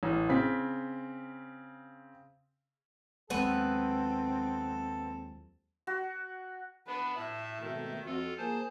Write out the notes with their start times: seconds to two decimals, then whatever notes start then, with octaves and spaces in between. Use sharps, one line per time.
0.03 A1
0.29 C#3 C4 B6
3.30 D#2 F#3 G#3 B3 C4 A4 B4
5.87 F#4
6.87 B3 D4 B4
7.17 A2 E5 A5
7.60 G#1 B2 D#3 A3
8.06 F2 F4 F#4 A4
8.38 F3 A#3 G#4 C5 A5